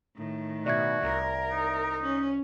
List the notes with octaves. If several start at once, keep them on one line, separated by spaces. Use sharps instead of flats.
A2 D#3
B2 F#4 D5 E5 G#6
C2 A#4
D#4
C#4